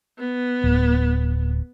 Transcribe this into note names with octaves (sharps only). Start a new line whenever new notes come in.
B3
D1